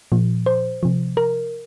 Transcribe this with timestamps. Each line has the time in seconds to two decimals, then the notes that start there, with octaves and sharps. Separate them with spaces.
0.12 A#2 F3
0.46 C5
0.83 C3 F3
1.17 A#4